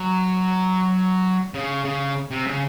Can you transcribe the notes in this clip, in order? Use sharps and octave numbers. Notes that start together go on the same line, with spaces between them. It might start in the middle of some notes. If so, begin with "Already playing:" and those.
Already playing: F#3
C#3
C#3
C3
C#3